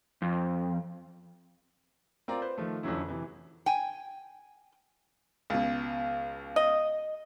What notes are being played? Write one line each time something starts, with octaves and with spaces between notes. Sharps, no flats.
F2
C4 F4 A#4 D5 A#5
B4 C5
D#3 F3 A3
F2 D3 E3 F#3 C#4 E4
C3 E3
G5 G#5
C#2 B2
D#5